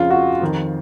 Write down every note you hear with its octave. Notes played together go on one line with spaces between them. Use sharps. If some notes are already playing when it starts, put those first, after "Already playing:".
Already playing: F2 C#3 F4
F#4
F2 D#3